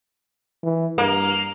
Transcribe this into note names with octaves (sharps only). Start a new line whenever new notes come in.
E3
G2 A#3